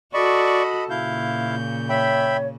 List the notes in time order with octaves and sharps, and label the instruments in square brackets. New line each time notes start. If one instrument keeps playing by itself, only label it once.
[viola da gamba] F#4 A4 [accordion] D5 C#6 [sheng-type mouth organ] D#5 B5
[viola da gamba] A#2 C#3 [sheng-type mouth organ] E4 F5 [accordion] G6
[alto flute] C#5 [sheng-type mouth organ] E5 G5 B5